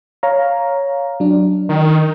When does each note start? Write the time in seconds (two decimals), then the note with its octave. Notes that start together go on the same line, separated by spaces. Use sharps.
0.23 C#5 F5 A#5
1.20 F#3 D4
1.69 D#3